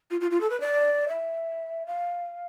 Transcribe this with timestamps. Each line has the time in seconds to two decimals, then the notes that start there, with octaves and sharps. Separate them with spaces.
0.11 F4
0.21 F4
0.31 F4
0.41 A4
0.50 B4
0.60 D5
1.08 E5
1.87 F5